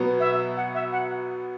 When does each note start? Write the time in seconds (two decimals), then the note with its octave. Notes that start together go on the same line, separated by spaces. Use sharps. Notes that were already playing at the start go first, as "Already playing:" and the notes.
Already playing: B2 F#3 B3
0.20 E5
0.56 F#5
0.74 E5
0.92 F#5